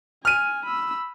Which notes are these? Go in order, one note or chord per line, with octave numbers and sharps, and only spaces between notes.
G#5 F6 D#7
B5 E6